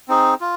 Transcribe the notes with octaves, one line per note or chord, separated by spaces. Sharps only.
C4 D#4 G#4
F4